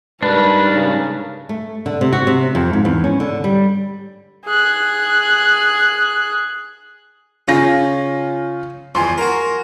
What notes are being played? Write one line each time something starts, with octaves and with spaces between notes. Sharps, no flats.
G#2 G3 D4 D#4 A#4 B4
C#3
A3
D3
C3
F#4
C3
F2
G#2
E2
C#4
D3
G3
G#4 F#6
C#3 C#4 F4 A#6
E2 F3 G#5 C6
F#4 A#4